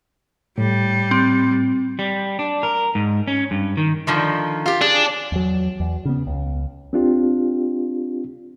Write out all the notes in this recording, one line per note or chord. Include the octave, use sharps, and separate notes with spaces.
A2 G3
C4
G3
D4
A#4
G#2
C#4
G2
D#3
D3 D#3 F3
F4 G4
D4 G#4
E2 F#3
E2
C#3 B3
C#2
C4 D4 F4 G4